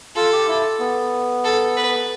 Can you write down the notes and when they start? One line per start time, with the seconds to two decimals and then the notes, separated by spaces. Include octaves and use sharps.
0.15 F4 A4
0.32 G4
0.48 E4
0.79 B3
1.44 A4
1.76 B4